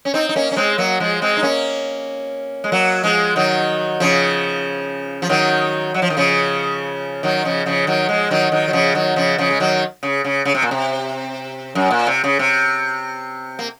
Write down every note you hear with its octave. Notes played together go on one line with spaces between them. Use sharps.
C#4
C4 D#4
D#4
A#3 C#4
C#4
G#3 C4
F#3 A#3
F3 G#3
G#3 C4
D#4
A#3 C#4
G#3
F#3 A#3
F3 G#3
D#3 F#3
C#3 F3
F3
D#3 F#3
F#3
F3
D#3
C#3 F3
D#3 F#3
C#3 F3
C#3 F3
D#3 F#3
F3 G#3
D#3 F#3
D#3 F#3
F#3
C#3 F3
D#3 F#3
C#3 F3
C#3 F3
G#3
D#3 F#3
C#3
C#3
C#3
C3
A#2
C3
F#2
A#2
C3
C#3
C3
A#3